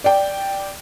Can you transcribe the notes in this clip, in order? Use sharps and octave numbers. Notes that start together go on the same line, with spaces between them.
D5 G5